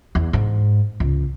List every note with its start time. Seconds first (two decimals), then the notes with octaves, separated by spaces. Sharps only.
0.15 E2
0.33 G#2
1.00 C#2